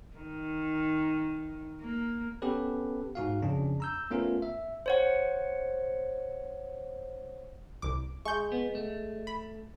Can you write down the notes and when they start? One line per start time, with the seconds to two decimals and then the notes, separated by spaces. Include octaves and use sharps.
0.16 D#3
1.82 A#3
2.42 B3 C#4 G4 A4 B4
3.15 G#2 F#4 F5
3.42 F2 C#3 C#4 D4
3.80 A#5 E6 G6
4.11 A3 B3 C#4 F4 A#4
4.42 E5
4.86 C5 C#5 F#5
7.82 C2 D6
8.25 G#3 C#6 G6
8.52 B3
8.75 A3
9.27 B5